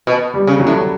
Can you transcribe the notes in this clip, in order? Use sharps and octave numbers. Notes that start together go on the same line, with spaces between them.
B2
G3
C#3
F#3
A2